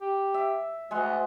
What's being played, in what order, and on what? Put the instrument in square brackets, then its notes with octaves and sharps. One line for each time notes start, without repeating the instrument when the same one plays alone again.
[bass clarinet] G4
[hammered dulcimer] E5
[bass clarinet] D2 [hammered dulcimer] G#3 F#5 C6